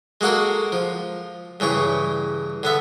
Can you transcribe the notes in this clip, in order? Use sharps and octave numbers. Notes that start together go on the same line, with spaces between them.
G#3 A#3 F#4 A4 A#4
F3
G2 C#3 E3 C#6
D3 B3 E5